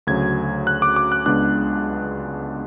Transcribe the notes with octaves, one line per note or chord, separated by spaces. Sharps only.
D2 C#3 F#3 G#6
F#6
D6
D6
F#6
C#2 C#3 G#3 B3 D4 F#6